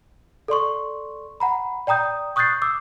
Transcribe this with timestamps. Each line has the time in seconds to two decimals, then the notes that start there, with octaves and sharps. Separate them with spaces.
0.48 A4 D5 C6 C#6
1.40 F#5 A#5 B5
1.87 D5 G5 A#5 D#6 G6
2.36 C#6 D#6 F#6 G6 A6 C7
2.62 D6 E6